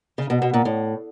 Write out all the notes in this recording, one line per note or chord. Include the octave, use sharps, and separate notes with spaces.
C#3
B2
B2
A#2
A2